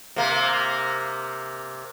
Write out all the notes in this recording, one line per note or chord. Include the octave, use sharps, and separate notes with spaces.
C3 A#3